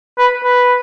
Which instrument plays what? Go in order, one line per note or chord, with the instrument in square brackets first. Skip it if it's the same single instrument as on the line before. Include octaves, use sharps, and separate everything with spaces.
[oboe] B4
B4